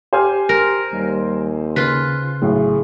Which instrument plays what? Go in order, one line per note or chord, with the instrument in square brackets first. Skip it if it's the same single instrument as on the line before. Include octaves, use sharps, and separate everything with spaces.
[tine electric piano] G4 [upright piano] C5 G#5 F6
[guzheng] A#4
[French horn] D#2 [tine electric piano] G3
[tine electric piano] C#3 [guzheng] F4 B4
[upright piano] B1 A2 [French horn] G#4